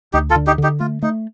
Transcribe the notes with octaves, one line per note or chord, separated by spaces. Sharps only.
D2 D#4 G4
F4 A4
D3
D#4 G4
D3
D#4 G4
A3 F4
A3 D#4